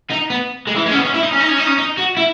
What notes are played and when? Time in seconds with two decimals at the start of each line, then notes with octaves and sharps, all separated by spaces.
0.10 D#4
0.30 B3
0.67 G#3
0.76 E3
0.86 G#3
0.91 C#4
0.94 B3
1.05 C#4
1.14 E4
1.23 D#4
1.33 C#4
1.40 D#4
1.49 C#4
1.58 D#4
1.67 C#4
1.78 D#4
1.98 F#4
2.17 E4